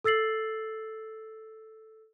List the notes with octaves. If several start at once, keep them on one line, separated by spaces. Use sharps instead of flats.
A4 E6 A6 C7 F#7